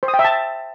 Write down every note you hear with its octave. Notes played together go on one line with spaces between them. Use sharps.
C5
D#6
G5
E5
A5